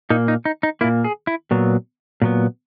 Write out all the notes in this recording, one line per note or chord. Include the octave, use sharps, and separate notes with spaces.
A#2 A#3 D#4
D#4
D#4
D#4
A#2 A#3 E4
G#4
E4
A#2 F#3 B3
A#2 F#3 B3